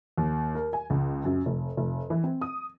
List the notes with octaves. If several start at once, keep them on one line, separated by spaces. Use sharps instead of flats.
D#2
A#4
G#5
C#2
F#2
F1
F1
E3
C4
D#6